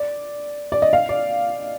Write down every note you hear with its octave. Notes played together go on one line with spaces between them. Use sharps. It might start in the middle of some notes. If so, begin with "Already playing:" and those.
Already playing: D5
D5
D#5
F5
D5